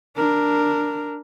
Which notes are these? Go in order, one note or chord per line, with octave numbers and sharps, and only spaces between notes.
D4 A#4